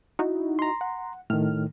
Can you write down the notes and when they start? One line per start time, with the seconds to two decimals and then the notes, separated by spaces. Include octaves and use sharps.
0.19 D#4 E4 F#4
0.59 A#5 C6
0.81 F#5
1.30 A2 D#3 F6